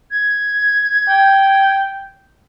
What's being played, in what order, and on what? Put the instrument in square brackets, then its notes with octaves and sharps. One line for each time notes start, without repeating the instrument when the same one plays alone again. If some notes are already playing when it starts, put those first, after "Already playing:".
[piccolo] G#6
[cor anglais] G5